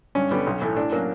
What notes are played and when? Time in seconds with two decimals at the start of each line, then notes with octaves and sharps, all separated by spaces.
0.15 G2 C#4
0.31 D3 G3 B3
0.47 B1
0.62 A2 E3 A3
0.76 A2 D4
0.92 F#3 A#3 C#4